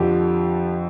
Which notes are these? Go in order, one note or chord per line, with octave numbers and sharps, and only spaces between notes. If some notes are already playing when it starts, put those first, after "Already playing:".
Already playing: F2 D3 F3 G4